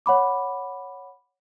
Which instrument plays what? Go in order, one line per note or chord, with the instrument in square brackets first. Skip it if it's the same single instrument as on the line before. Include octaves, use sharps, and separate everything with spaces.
[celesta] C#5 F#5 B5 D6